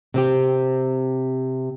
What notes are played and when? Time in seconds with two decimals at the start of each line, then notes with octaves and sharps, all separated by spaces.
0.14 C3 C4 G4